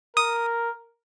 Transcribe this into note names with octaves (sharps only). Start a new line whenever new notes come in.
A#4 D#6